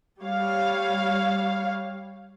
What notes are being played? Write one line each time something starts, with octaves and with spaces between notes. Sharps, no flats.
G3 C#5 F5